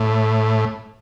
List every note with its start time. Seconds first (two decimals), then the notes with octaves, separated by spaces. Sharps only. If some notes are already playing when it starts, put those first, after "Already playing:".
Already playing: A2